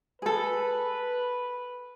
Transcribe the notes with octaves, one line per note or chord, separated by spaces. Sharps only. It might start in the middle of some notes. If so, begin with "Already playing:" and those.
G#4 A4 B4